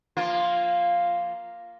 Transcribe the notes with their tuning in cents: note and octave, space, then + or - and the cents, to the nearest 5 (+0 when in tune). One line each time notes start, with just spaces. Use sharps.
F3 -20 A#3 +0 F4 +0